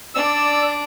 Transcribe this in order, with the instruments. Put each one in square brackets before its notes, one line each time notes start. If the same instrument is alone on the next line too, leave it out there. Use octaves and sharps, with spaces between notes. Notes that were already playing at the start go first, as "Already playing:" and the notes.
[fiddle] D4 [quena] D5 [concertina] E6